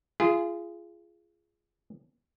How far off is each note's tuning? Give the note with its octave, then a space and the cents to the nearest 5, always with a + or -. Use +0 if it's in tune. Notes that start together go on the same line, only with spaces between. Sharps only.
F4 -30 G#4 +0